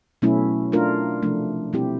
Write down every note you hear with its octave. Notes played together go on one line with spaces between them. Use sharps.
B2 F#3 A3 C#4 E4
A3 D4 F4 A#4
C3 F3 A3 D4
B2 G3 C4 E4 G4